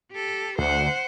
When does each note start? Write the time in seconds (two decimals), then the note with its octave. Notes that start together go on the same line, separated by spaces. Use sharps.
0.12 G4 A4
0.58 D2 C5 F#5